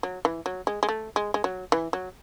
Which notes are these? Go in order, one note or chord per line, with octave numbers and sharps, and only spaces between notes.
F#3
E3
F#3
G#3
G#3
A3
G#3
G#3
F#3
E3
F#3